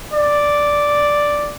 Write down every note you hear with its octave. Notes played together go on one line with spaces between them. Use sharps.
D5